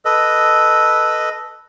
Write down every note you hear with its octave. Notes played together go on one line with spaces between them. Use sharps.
A4 B4 D#5